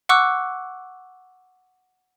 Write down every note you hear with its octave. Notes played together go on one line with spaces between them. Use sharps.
F#5 C#6 D6 E6 F#6